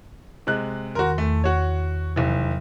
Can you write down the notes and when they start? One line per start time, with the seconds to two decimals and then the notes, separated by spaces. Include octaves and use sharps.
0.47 C3 G#3 F#6
0.95 E2 D#3 F#4 A#4 C6
1.18 E2 A3
1.44 F#4 C#5
2.16 F1 C3 E3 F#3